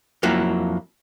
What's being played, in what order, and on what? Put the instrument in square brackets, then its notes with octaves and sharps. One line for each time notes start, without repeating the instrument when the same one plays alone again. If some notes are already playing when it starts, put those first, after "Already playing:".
[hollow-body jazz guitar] F2 F#3 A#3 E4